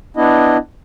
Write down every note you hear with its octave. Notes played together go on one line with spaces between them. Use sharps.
B3 D4 E4 D#5